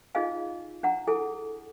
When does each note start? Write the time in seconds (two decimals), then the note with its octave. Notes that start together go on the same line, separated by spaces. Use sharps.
0.15 D#4 F4 G#4 D#5 F5 G#5
0.83 D4 F#5 A#5
1.07 E4 G#4 A4 G#5